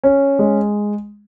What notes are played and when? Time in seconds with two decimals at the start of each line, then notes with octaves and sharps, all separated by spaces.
0.04 C#4
0.39 G#3